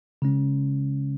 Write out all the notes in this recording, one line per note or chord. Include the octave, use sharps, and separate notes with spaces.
C#3 G#3 C#4